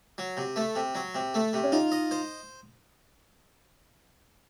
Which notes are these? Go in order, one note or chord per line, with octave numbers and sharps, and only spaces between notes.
F#3
C3
A3
C3
F#3
C3
A3
C3
C#4
D#4 F4
D#5
C5